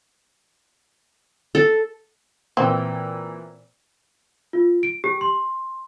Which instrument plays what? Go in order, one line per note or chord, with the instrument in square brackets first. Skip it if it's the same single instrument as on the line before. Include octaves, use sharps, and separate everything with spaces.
[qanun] A4
[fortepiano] A#2 E3 G5 [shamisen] C4
[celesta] F4
D7
G4
C6